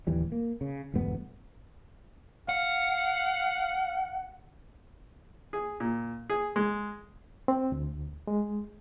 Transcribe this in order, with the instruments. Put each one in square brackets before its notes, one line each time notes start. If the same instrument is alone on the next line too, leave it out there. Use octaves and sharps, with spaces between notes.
[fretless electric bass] D1 D#2 E3 G3
A#3
C#3
E1 D2 G2 B3
[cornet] F5 [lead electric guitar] F#5
[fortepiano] G#4
A#2
G#4
G#3
[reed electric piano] C4
D2
G#3